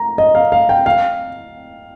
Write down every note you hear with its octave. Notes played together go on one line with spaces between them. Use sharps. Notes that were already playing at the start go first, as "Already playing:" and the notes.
Already playing: A#5
D#5
F5
F5
G5
F5